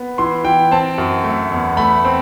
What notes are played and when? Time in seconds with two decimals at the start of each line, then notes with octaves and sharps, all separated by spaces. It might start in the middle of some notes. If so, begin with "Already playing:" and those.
Already playing: B3
0.18 E3 C6
0.45 E3 G5
0.71 C4 A5
0.98 F#2
1.24 A3
1.52 E2
1.77 A3 B5
2.05 C4